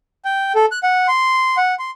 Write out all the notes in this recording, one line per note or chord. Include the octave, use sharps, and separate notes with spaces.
G5
A4
F#6
F#5
C6
F#5
C6